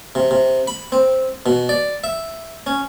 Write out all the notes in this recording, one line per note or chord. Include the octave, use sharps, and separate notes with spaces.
C3
C3
B5
C4
B2
D5
E5
C#4